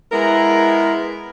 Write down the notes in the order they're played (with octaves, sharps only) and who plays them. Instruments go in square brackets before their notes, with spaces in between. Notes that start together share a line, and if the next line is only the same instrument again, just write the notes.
[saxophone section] G#3 B3 E4 A#4